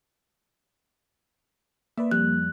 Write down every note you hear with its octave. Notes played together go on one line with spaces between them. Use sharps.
A#3 B4 D5 E5
F2 G3 F#6